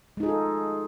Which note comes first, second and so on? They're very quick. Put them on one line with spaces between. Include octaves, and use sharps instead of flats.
G#3 D#4 G#4 F4 A4